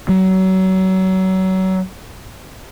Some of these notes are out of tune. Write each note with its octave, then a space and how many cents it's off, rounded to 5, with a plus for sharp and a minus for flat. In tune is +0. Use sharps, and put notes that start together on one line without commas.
F#3 +30